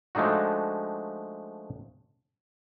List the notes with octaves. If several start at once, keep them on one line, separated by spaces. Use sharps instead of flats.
F3 G#3 A3 D4 D#4 F#4